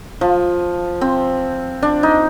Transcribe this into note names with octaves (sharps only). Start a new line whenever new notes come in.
F3
C4
D4
D#4